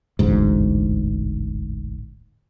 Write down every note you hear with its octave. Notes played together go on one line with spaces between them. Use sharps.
E1 A1 D2 G#2